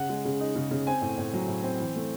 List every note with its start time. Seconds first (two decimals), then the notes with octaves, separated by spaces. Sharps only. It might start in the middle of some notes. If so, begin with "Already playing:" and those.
Already playing: C#3 F#5
0.09 G#3
0.25 C#3
0.40 D#4
0.56 C#3
0.71 C#3
0.87 C4 G#5
1.02 A2
1.18 A2
1.34 F#3
1.48 A2
1.63 C4
1.80 E3
1.95 A3